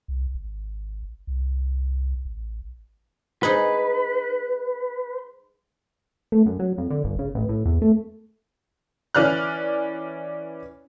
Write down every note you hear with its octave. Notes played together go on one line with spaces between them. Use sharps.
C2
G#1
C2
A1
D#4 G#4 B4 D#5
A3
F#2
F#3
F2
D3
G1
C#3
A1
A2
E2
A3
E3 C#4 D5 F6 F#6